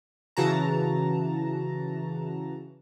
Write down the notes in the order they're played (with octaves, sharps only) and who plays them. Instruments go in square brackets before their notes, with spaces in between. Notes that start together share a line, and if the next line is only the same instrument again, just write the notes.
[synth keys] C#3 E3 F#4 A5 A#5